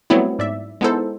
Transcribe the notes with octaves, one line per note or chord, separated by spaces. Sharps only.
F#3 G3 A3 B3 C4 E4
G#2 D5 E5
G#3 B3 D#4 E4 A4 C5